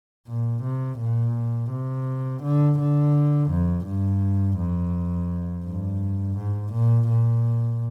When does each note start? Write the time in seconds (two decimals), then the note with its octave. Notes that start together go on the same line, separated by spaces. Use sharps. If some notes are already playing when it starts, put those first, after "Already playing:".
0.28 A#2
0.63 C3
0.99 A#2
1.71 C3
2.43 D3
2.79 D3
3.50 F2
3.86 G2
4.58 F2
5.65 G2
6.37 G#2
6.73 A#2
7.08 A#2